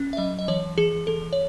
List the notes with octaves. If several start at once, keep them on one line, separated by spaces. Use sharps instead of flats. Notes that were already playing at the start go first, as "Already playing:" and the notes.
Already playing: C#4
E5
F#3 D#5
D#5
E3 C#5
E3 G#4
E3 A4
C#5